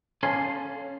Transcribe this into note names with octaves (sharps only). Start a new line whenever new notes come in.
C#4 A4 F5 G#5 C6